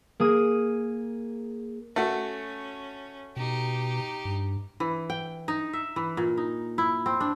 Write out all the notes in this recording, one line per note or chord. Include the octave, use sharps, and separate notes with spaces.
A#3 G#4 D#6
A3 C#4 F#4
B2 D#4 G4
G2
E3
G5
D#4
E5
E3
A#2
D#4
E4
C4
D4